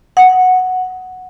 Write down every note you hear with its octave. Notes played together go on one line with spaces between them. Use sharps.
F#5